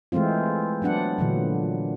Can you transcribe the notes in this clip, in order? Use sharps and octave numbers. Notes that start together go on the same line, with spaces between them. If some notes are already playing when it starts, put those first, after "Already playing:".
E3 G#3 A3 C4 F4
F#3 B3 D4 F#5
A#2 D3 E3 F#3